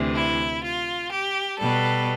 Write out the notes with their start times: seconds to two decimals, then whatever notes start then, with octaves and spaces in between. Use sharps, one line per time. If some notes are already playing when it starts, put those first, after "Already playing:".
Already playing: D2 C3 E3
0.15 E4
0.63 F4
1.11 G4
1.59 B2 G3 A4